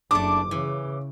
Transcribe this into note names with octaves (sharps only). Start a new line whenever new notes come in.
F#1 A3 D4 D6
C#3 E3